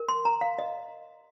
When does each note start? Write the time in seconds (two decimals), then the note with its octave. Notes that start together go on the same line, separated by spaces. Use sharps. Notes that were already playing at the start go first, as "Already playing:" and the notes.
Already playing: A#4
0.08 C6
0.25 A#5
0.41 F5
0.59 D#5